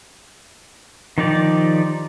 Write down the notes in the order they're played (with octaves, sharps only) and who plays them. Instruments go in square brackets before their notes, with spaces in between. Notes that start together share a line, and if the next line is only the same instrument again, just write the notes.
[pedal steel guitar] D#3 F3 D#4 G4 D5